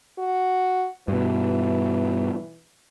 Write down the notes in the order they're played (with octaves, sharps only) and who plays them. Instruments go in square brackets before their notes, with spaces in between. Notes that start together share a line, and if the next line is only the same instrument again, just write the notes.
[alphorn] F#4
[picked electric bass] G2 B2 [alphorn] E3